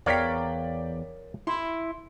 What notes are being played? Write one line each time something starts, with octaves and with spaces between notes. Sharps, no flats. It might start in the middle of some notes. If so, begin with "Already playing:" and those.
E2 A#4 C#5 D5 F5 G5 B6
E4 C6